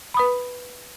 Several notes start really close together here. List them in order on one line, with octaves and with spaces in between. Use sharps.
B5 D#6 B4